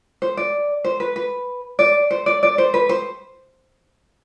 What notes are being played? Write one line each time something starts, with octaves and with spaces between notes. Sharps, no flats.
C5
D5
C5
B4
B4
D5
C5
D5
D5
C5
B4
C5